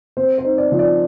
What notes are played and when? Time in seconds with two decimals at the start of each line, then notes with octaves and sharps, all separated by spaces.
0.17 C4 C5
0.38 C5
0.44 D#4
0.58 D5
0.72 F3
0.79 D5